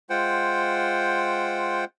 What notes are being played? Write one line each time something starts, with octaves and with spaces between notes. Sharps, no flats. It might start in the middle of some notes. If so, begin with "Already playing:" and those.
G#3 F4 C5 F#5 G5